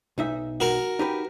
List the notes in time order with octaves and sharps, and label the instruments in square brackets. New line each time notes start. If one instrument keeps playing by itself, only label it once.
[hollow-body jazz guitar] B1 D#4 E5
[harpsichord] F#4 A#4
[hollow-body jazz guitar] D#4 G4 B4